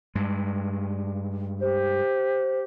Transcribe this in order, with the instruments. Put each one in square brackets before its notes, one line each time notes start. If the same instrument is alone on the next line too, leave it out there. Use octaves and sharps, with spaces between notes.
[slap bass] G2 G#3
[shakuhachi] G4 [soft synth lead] C5